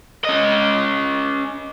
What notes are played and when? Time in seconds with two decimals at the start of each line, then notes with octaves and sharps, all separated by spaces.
0.24 C#4 D#5